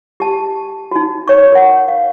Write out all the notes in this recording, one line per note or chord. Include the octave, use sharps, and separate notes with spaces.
G4 A5
D#4 F#4
C#5 C#6
A#4 F#5
F5